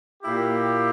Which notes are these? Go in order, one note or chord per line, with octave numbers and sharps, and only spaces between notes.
A#2 A#3 E4 G4